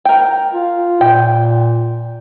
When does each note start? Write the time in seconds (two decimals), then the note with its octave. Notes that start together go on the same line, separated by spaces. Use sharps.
0.05 A#4 G5
0.53 F4
1.01 A#2 G5